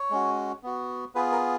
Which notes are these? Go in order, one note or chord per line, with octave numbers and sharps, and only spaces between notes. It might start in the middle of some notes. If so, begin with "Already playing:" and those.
Already playing: C#5
G#3 C#4 F#4
B3 F#4
B3 F4 G#4 B4
A#4